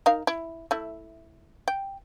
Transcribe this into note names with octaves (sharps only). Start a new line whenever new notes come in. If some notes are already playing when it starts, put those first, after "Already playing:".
D#4 A#4 F5
E4
A3 E4
G5